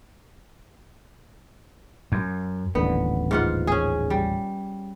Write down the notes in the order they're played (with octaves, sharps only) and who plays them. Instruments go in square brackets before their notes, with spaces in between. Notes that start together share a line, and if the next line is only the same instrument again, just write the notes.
[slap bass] F#2
[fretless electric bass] D#1 A1 D3 [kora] B3
[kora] G#2 F4 F#5
C#4 G#4
G3